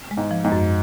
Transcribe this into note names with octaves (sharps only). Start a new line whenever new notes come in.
G#3
G#2
F3
G#2
F#2